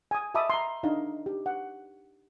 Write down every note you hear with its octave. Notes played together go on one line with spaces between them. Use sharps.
G#5 D#6
D#5 E5 A5 B5 D6 D#6
A#5 C6
D4 D#4 F5
G4
F#5